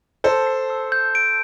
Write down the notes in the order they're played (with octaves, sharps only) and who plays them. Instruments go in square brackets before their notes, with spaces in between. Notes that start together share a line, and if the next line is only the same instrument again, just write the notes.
[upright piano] A4 C5 [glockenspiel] A5
[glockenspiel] C7
E6
G6
D7